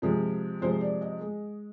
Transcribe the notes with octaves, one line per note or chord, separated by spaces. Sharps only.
C3 F3 G#3
C3 F3 G#3 C5
D5
D#5
G#3